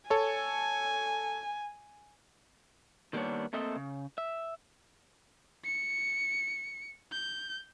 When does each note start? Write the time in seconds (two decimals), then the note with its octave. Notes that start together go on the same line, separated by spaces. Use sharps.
0.10 A4 C#5 G#5
3.13 D#3 G3 A#3 B3 D4 C#5
3.53 A3 A#3 C4 A4 D#5 E5
3.76 C#3
4.18 E5
5.65 C#7
7.12 G6